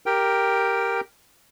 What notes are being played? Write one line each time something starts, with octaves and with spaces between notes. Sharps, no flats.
G4 A#4 G5